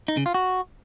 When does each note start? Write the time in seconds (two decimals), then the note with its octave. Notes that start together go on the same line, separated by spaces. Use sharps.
0.08 D#4
0.17 C#3
0.26 F4
0.34 F#4